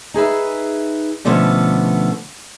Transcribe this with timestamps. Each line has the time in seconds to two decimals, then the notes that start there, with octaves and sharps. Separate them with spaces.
0.14 D#4 G#4 B4 E5
1.25 B2 D3 F3 A3 B3 C#4